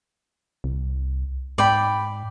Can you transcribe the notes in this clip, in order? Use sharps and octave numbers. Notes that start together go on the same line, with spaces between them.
C2
G#2 D5 G5 B5